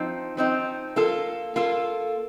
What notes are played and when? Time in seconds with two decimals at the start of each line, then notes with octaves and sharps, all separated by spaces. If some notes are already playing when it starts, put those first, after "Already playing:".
Already playing: F3 C4 D#4
0.37 F3 C4 D#4
0.96 A#3 F4 A4
1.56 A#3 F4 A4